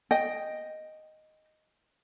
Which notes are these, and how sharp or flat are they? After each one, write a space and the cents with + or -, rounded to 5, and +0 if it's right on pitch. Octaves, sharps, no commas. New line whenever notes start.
D#5 +0 G5 +0